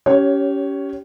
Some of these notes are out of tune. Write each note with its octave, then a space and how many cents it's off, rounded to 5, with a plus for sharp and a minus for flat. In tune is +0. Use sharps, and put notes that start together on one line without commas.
C#4 +20 G4 -20 C#5 +0